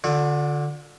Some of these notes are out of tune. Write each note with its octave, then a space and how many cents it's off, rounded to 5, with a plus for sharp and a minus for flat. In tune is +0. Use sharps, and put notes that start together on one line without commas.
D3 +0 F4 +45